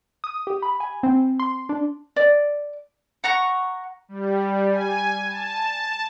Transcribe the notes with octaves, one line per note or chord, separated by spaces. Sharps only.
D#6
G4
B5
G#5
C4
C6
D4
D5
F#5 A#5 C#6
G3
G#5
A5